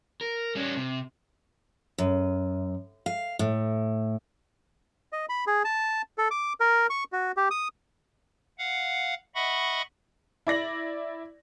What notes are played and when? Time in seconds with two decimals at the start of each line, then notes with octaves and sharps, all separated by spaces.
0.21 A#4
0.55 G3 C#4
0.77 C3
1.98 F#2
3.06 F5
3.39 A2
5.12 D#5
5.29 B5
5.47 G#4
5.65 A5
6.18 A4
6.31 D6
6.60 A#4
6.90 C#6
7.12 F#4
7.37 G4
7.51 D#6
8.58 F5 F#5
9.35 D#5 E5 F#5 B5 C#6
10.47 E4 D5 A#6 F#7